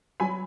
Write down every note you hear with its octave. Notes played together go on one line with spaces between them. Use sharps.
F#3 G#5 B5